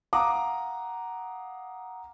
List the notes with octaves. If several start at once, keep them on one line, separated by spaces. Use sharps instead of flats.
F5 F#5 A#5 D6 D#6